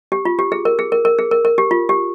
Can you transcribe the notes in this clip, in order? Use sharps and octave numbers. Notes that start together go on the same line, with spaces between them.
G4
F4
G4
G#4
A#4
G#4
A#4
A#4
G#4
A#4
A#4
G4
F4
G4